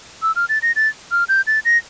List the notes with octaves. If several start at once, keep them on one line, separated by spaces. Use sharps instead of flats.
E6
F6
A6
A#6
A6
F6
G6
A6
A#6